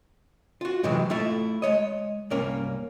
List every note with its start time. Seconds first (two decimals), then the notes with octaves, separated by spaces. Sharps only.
0.61 F4 F#4
0.83 G2 C3 E3 F#3 G#3
1.10 A3 E4 F4 A4 E5 F5
1.62 G#3 C#5 D#5
2.30 C2 G2 A#3 C#4 A#4